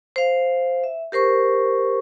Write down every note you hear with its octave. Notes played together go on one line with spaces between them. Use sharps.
C5 F5
E5
G4 A#4 C5 C#6